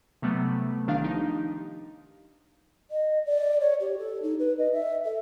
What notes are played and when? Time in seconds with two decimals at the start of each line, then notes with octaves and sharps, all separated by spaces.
0.22 C3 F#3 G3 A3 B3
0.87 A1 D#3 D4 F5
1.04 F3 D#4 G4
2.90 D#5
3.26 D5
3.60 C#5
3.80 G4
3.98 A4
4.22 D#4
4.39 B4
4.58 D#5
4.72 E5
5.04 A4